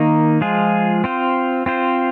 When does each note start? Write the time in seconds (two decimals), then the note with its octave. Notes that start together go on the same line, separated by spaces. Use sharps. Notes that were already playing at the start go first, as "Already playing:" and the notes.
Already playing: D#3 A#3 D#4
0.41 F3 G#3 F4 G#4
1.04 C4 F4 C5
1.66 C4 F4 C5